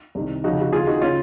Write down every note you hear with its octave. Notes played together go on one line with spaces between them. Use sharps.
C2 C3 D#3
F2 C#3 D#4 F#4
F#4
D#2 C#3 F4 G#4
D#4 F#4
C#3 C#4 F4